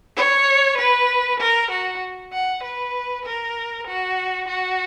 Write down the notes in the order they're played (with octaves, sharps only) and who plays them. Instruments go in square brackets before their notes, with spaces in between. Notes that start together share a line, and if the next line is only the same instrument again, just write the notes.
[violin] C#5
B4
A#4
F#4
F#5
B4
A#4
F#4
F#4